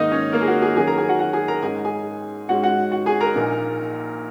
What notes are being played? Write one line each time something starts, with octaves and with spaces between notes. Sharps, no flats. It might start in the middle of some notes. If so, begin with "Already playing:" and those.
Already playing: G#2 D#3 A#3 D#4 D#5
C#4 C#5
A#3 A#4
G#4
F#4
G#4
F#2 D#3 F#3 C#4 G#4 G#5
A#4 A#5
G#4 G#5
F#4 F#5
F#4 F#5
G#4 G#5
A#4 A#5
G#2 G#3 C#4 G#4 G#5
G#4 G#5
G#2 G#3 C#4 F#4 F#5
F#4 F#5
F#4 F#5
G#4 G#5
A#4 A#5
A#1 A#2 A#3 D#4